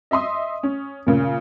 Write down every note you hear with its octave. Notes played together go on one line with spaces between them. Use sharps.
D#5 E5 C6 D#6
C#4
A#2 C#3 A#3